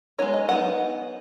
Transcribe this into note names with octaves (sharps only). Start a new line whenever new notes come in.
G#3 B3 D#4 C#5
D#5
F#3 B3 D#4 F#5